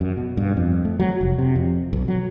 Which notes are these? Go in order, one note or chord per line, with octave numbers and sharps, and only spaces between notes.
F#2
B2
G2
F2
A3
F#3
F1
C3
F2
B1
F#3